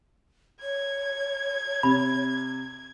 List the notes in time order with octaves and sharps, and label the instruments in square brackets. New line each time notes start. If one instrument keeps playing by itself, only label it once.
[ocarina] C#5 [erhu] G#6
[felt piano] C3 [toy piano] B5